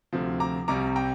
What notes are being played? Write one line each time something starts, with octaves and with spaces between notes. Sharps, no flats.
D2 C3 F3
A#5 D6
C2 C3 G3 A#5 D6
G5 A#5